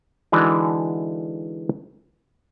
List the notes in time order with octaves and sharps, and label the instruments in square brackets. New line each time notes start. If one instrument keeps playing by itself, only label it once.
[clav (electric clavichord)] D3 E3 G#3 D#4 F#4 D5